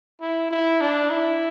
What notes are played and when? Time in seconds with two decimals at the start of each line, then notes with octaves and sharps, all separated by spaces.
0.21 E4
0.51 E4
0.81 D4
1.10 E4